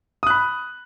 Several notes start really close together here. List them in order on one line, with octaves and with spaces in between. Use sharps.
D#6 F#6 B5